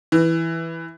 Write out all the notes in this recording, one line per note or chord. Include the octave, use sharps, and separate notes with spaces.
E3